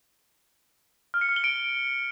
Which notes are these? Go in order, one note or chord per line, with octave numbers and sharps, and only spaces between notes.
F6
C#7
F6
G7
D7